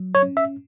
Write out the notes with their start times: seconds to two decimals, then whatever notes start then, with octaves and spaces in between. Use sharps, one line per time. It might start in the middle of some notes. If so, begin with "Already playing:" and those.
Already playing: F#3
0.15 C#5
0.23 C#4
0.37 E5